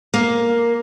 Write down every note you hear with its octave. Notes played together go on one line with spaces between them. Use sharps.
A#3